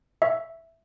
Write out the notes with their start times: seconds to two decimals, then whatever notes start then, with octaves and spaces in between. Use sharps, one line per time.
0.22 E5